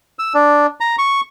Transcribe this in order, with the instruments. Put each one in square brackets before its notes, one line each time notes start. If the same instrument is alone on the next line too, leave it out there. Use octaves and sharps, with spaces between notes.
[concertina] E6
D4
A#5
C#6